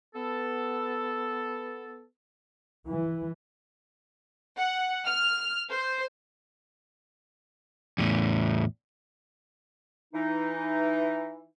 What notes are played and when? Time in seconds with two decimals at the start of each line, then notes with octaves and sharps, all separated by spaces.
0.14 B3 A4
2.88 E3
4.57 F#5
5.06 F6
5.71 C5
7.98 E2 A2
10.14 E3 D#4